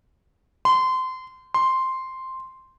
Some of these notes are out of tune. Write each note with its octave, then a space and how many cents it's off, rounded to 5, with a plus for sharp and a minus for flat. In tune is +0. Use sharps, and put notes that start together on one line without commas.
C6 -25
C6 +0